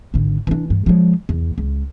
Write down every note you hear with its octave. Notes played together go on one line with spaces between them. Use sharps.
G#1 D3
E3 D4
G2
F3 G#3
E2
C#2